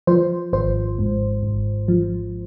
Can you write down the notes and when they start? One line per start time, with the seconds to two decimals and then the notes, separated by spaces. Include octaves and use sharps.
0.07 F3 C5
0.53 G#1 C5
0.99 G#2
1.43 G#1
1.88 F3